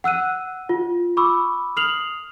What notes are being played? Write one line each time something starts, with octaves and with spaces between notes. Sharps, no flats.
F#5 E6 F#6 D#7
F4
B5 C#6 D6 E6
D#6 F6 C7 F7 F#7